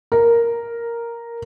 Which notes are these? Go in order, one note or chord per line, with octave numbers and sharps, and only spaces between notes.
A#4